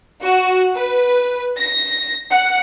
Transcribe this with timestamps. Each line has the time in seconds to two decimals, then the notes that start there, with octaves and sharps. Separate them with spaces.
0.22 F#4
0.76 B4
1.58 A#6
2.30 F#5